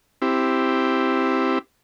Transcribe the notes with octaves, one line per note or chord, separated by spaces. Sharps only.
C4 E4 G4